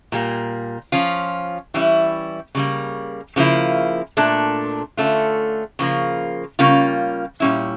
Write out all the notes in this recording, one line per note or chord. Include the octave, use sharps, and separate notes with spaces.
A#2 G3 A#3
F3 C#4 F4
E3 G3 C#4 E4
C#3 G3 A#3
C#3 F3 A#3 E4
A#2 A3 D4
D3 A3 C#4 F4
C#3 F3 A#3
C#3 G3 A#3 C#4 F4
A#2 G3 C#4 E4